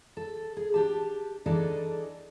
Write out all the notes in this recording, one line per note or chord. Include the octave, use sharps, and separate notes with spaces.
A4
G#4
D4 G4 A5
E3 D4 D#4 G#4 A4 D5